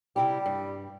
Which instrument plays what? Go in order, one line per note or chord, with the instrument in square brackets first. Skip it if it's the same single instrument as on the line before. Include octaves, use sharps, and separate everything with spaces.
[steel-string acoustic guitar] C3 E4 G4 [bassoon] G3
[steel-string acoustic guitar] G2